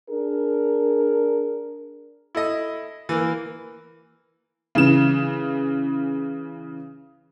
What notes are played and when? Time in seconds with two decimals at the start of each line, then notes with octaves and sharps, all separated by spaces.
0.10 D4 G#4 A#4
2.35 E4 A4 D#5
3.09 E3 A#3
4.75 C#3 E3 E7